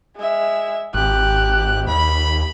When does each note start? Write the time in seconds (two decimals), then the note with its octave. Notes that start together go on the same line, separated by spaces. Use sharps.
0.16 G#3 E5
0.94 G#1 G4 F#6
1.87 D#2 B5